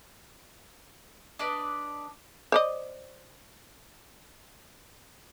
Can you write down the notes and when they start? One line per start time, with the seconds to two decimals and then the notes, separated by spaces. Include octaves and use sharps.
1.39 D4 B4 D5 D#5
2.52 C5 D5 D#5